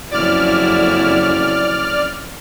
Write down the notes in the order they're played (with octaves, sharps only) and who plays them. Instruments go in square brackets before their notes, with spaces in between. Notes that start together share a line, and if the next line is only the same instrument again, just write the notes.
[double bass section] F#1 F2 C#4 [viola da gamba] E4 F#4 [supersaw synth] D5 F6